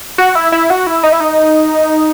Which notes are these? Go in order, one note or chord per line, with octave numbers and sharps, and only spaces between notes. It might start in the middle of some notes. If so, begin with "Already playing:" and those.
F#4
E4
E4
F#4
E4
D#4
E4
D#4